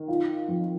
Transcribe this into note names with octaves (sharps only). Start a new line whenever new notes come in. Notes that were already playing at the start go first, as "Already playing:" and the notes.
Already playing: D#3
F4
F2